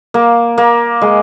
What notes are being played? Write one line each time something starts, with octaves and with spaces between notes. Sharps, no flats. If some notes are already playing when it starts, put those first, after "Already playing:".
A#3
A#3
G#3